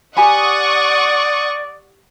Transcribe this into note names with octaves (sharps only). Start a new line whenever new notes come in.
G4 D5 F#5 G#5 B5 C#6 D#6